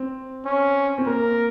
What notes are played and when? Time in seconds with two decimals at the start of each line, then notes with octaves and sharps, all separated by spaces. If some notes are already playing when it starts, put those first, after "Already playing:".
Already playing: C4
0.45 C#4
0.98 C4
1.06 A#3 A#4